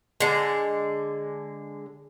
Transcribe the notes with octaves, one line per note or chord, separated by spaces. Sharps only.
D3 G#3